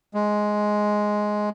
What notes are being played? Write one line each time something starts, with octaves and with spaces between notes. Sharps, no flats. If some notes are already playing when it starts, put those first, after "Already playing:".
G#3